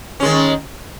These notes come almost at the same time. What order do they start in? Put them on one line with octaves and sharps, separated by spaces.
C#4 G#3 D#3